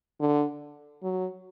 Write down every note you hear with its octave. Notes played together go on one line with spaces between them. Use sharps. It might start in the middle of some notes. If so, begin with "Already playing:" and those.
D3
F#3